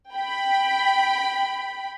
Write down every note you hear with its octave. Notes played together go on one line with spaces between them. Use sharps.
G5 B5